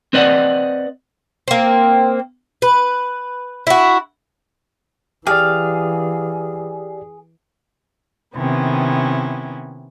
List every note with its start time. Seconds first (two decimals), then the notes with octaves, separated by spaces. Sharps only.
0.13 C4 B4 D5 D#5 F#5
1.48 A#3 C4
2.62 B4
3.67 E4 F#4
5.27 E3 G4 G#4 D5 F5
8.35 C3 D#3 B3 C#4 E4